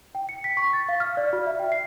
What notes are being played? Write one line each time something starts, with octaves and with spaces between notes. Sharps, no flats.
G5
C#7
B6
C#6
A6
F5
F6
D5
F#4
E5
G5
C7